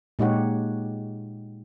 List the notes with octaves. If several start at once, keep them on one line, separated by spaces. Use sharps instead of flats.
A#2 G#3 D#4 G4 C#5 F#5